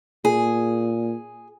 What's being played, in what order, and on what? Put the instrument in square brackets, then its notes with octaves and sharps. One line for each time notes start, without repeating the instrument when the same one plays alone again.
[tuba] A#2 [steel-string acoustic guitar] G#4